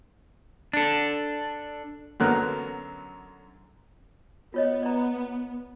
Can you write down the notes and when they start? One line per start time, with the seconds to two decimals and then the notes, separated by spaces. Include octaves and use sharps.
0.73 D4 A4
2.20 F#2 D3 F#3 B3 A#4 F#6
4.54 B3 F4 C#5 D#5
4.83 D5 A#5